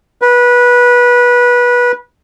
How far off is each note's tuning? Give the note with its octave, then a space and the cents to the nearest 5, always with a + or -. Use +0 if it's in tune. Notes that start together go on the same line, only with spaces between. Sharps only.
B4 -20